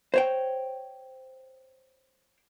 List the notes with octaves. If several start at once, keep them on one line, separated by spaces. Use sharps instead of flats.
C5 C#5 G5